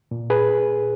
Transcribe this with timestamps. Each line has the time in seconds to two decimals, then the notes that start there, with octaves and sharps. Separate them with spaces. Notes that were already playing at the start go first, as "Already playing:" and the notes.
0.11 A#2
0.30 G#4 B4